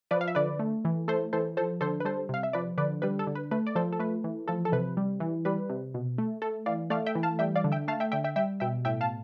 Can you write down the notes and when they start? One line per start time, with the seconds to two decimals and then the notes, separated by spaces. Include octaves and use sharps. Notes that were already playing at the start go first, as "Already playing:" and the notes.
0.11 F3 B4 D5
0.21 F5
0.28 E5
0.35 D3 B4 D5
0.59 A3
0.85 E3
1.08 A3 A4 C5
1.33 E3 A4 C5
1.57 F3 A4 C5
1.81 D3 A4 C5
2.00 B4
2.05 G3 A4 C5
2.29 C3 F5
2.43 E5
2.53 F3 B4 D5
2.78 D3 B4 D5
3.02 G3 B4
3.19 A4
3.27 D3
3.35 B4
3.51 A3 B4
3.67 D5
3.75 F3 A4 C5
3.92 A4
4.00 A3 B4
4.24 E3
4.48 F3 A4
4.65 A4
4.72 C3 B4
4.97 G3
5.20 E3
5.45 G3 B4
5.70 C3
5.94 B2
6.18 A3
6.42 A3 A4
6.66 E3 D5 F5
6.90 A3 D5 F5
7.06 E5 G5
7.15 E3
7.23 F5 A5
7.39 G3 E5 G5
7.56 D5 F5
7.64 D3
7.72 E5 G5
7.88 A3 F5 A5
8.00 E5 G5
8.12 D3 E5 G5
8.24 E5 G5
8.36 G3 E5 G5
8.60 B2 E5 G5
8.85 A2 E5 G5
9.01 F5 A5